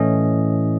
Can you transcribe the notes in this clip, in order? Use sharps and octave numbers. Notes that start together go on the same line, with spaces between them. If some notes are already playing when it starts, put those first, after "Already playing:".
Already playing: A2 E3 A3 C#4 D#5